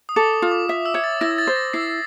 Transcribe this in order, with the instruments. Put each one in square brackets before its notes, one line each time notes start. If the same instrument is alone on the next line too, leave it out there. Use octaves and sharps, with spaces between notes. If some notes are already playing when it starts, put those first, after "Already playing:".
[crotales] D#6
[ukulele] A4 [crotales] D6
[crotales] D#6
[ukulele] F4
[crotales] D6
[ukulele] E5 [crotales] D#6
[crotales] E6
[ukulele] C#5
[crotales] A6
[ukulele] E4 [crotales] A#6
[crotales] G#6
A6
[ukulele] C5
[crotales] A#6
[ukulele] E4 [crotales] C7